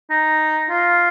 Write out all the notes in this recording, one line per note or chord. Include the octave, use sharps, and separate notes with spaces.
D#4
F4